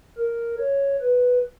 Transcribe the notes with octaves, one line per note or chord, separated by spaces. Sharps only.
A#4
C#5
B4